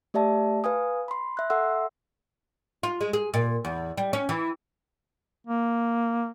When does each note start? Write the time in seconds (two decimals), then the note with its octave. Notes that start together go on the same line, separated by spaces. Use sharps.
0.14 A3 G4 D5 E5 A5
0.64 B4 F5 G#5 D#6
1.08 B5 C6
1.37 E5 F#6
1.50 A4 E5 F#5 C6 E6
2.83 F4
3.01 G#3
3.13 G#4
3.34 A#2
3.65 E2
3.97 G3
4.13 C#4
4.29 E3
5.47 A#3